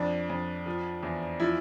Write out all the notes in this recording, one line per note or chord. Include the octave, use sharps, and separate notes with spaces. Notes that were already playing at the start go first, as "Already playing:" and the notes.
Already playing: F2 D4
F2
F3
E2
F3 E4